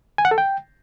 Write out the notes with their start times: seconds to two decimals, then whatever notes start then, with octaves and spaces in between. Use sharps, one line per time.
0.18 G#5
0.25 F#5
0.31 A4
0.38 G5